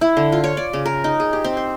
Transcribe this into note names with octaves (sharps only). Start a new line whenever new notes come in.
E4
D3
F4
C#5
D5
C#3
A#4
D#4
G#4
G4
C4
C5